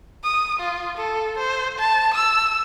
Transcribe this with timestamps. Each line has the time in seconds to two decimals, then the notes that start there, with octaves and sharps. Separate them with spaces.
0.24 D#6
0.59 F4
0.97 A4
1.38 C5
1.78 A5
2.14 E6